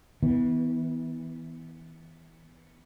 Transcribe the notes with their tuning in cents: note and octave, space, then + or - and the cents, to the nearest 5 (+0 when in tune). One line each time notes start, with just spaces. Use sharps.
E3 -25 B3 +0